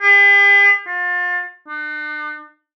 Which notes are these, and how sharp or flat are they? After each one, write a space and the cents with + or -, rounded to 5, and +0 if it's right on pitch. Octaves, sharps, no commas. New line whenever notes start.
G4 +45
F4 +35
D4 +45